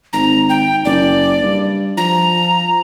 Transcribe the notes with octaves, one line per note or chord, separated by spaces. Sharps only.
G#1 A#5
G5
F#1 D5
G2
F3 A#5